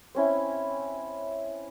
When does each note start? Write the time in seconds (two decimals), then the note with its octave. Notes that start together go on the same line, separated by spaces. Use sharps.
0.15 C4 C#4 E4